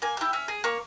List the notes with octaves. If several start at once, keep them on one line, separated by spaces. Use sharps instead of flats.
A#3 G#5
E4 G4 G5
C#4 E5
G#4
A#3 C#5